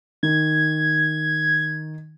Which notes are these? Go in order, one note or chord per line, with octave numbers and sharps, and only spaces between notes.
D#3 G#6